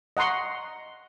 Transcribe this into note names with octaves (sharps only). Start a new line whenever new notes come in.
D#5 F#5 A#5 C6 C#6